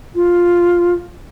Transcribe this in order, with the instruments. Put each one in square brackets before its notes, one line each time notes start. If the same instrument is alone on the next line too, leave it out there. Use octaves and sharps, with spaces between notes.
[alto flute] F4